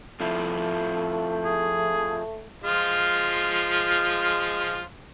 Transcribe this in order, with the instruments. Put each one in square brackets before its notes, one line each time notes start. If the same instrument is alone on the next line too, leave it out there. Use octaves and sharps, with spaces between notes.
[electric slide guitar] F2 F3 E4 [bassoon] A3
[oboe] G#4
[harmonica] F3 G#3 F4